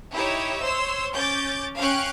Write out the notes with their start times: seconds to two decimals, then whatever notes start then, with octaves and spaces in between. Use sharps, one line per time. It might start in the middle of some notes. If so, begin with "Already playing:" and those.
0.15 D#4 E4 G4 C#5 E5
0.63 C5 C#5 C6 E6
1.14 C#4 D6 G6 A6
1.77 C#4 F5 G5 C#6 F#6